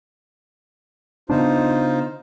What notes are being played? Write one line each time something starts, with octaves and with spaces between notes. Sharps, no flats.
C#3 B3 D4 D#4 F4 C5